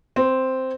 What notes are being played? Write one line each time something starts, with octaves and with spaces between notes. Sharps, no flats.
C4